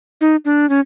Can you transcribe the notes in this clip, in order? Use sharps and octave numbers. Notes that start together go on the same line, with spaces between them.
D#4
D4
C#4